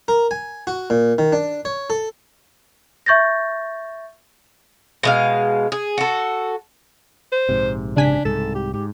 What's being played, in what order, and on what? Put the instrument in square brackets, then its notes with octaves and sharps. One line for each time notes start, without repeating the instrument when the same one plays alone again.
[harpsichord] A#4
G#5
F#4
A#2
D#3
D4
C#5
A4
[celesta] E5 C#6 G6 A6 A#6
[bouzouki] B2 G#3 F5
G#4
F#4 A4
[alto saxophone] C5
[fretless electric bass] A#1 G#2 C3
[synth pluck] C#3 G#5 B6 [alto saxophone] D4
[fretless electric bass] C2 G#2 [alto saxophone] A4
[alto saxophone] G4
[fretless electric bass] G#2 [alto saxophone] G4